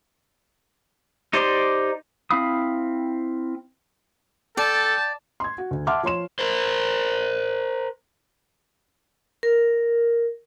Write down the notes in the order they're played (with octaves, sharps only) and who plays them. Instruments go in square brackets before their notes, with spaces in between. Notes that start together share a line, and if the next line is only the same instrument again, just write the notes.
[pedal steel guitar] D#4 G4 C5 D5 C6
C4 E4 F5 B5 D#6
[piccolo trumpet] A4 [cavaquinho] D5 [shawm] G5 [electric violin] A5
[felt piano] C6 G#6
F#4
D2
E5 F#5 A5 C6 D6 F6
F3 C#5 C6 E7
[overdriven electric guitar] A#4 C5
[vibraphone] A#4